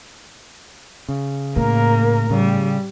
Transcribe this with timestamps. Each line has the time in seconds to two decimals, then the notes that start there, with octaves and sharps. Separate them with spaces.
1.09 C#3
1.56 A2 A#3 A#4
2.30 C#3 G3